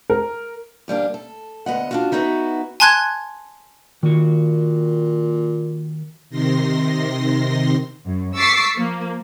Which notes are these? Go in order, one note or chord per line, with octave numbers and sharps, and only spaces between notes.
A#4
D2 G3 A#3 D4
A4
D2 B3 D#5 F#5
D4 F4 F#4
B3 D#4 E4 F#4 A#4 B4
G#5 A5 C6 F#6 G#6
A#2 D#3 F#4
C3 D#3 C6 A#6
F#2
C#6 D6 E6 A6 B6 C7
F3 A#3